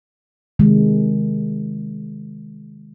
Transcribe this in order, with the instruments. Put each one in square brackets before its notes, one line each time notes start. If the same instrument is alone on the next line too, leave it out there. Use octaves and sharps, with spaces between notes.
[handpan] C3 D#3 G#3